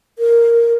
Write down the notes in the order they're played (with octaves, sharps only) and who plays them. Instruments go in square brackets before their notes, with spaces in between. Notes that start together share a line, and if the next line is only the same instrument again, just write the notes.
[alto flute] A#4